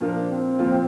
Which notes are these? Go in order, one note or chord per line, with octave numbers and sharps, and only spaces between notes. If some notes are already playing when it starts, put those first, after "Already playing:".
A#2 F3 A#3 D4 F4 A#4
C4
A#2 F3 A#3 F4 A#4